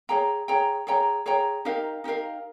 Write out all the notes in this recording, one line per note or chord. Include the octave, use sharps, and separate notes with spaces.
G#4 C#5 G5 A#5
G#4 C#5 G5 A#5
G#4 C#5 G5 A#5
G#4 C#5 G5 A#5
D#4 G4 A#4 F5
D#4 G4 A#4 F5